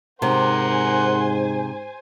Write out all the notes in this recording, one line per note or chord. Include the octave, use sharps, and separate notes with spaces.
G#2 C3 A#4 C5 F#5 G#5 C6